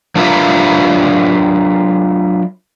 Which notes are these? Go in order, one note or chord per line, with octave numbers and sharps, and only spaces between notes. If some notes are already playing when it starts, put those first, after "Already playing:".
F#3 D4 F4 A#4 B4 E5